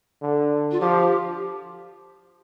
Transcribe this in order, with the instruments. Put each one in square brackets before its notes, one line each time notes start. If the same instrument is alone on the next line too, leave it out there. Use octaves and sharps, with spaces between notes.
[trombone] D3
[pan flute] F4
[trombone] F3 [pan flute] G4